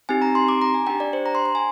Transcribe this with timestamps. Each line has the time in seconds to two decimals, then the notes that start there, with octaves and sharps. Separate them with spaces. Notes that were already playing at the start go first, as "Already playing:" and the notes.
0.09 C4 D#4 G4 G#5
0.22 A#5
0.35 C6
0.48 D6
0.62 A#5
0.74 G#5
0.87 D4 G4 G5
1.00 D5
1.13 C5
1.26 A#5
1.35 C6
1.45 C6
1.55 G#5